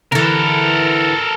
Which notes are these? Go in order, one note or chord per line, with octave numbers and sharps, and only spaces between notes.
D3 E3 A4 A#4